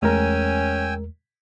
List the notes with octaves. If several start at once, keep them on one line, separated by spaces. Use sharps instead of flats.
E2 G#3 A3 C#4 A#4 G5 G#5 E6